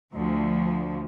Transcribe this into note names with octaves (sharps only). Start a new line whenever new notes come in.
D2 F3